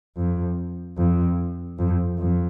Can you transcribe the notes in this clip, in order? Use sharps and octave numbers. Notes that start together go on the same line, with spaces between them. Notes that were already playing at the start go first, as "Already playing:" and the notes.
F2
F2
F2
F2